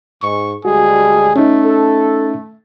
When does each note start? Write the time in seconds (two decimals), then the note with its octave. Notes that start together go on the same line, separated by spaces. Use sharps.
0.22 G#2 C#6
0.65 D2 G3 G#3 F#4 G#4
1.36 A3 C#4 D#4
1.65 A4